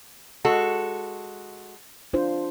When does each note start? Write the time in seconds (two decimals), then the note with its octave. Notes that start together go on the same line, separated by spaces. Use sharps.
0.45 G#3 F#4 A4
2.13 D4 F4 C5